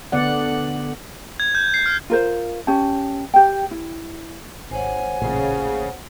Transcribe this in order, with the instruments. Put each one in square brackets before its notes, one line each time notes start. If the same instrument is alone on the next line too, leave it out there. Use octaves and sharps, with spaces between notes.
[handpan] D3 B3 D5 F#5
[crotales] G#6
G6
C7
F6
[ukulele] F4 A#4 C5
C#4 G4 A5
G4 G5
E4
[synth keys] G#1 [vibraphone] C5 C#5 F#5 [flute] G#5
[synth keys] A1 A#2 C7 [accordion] C#3